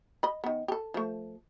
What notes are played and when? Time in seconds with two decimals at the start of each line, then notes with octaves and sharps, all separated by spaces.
0.23 D#5 B5
0.44 D#3 B3
0.68 G4 A4
0.94 F3 A3